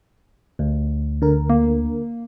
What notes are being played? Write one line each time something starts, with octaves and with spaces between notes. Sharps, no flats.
D2
D3 A#4
A#3